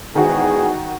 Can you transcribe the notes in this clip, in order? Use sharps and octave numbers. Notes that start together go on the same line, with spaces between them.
E2 G#2 D#3 F#4 G#4